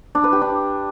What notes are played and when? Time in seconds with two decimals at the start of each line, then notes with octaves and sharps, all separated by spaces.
0.15 D4
0.24 B4
0.33 G4
0.41 D4